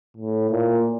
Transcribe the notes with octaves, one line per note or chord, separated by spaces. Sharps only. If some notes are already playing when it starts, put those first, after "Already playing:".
A2
A#2